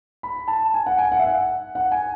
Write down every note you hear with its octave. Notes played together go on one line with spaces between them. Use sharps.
B5
A5
G#5
F#5
G#5
F#5
E5
F#5
F#5
G#5